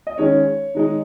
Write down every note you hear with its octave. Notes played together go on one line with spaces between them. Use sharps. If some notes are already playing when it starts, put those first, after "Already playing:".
D#5
D#3 G#3 C#4 C#5
D#3 G#3 D#4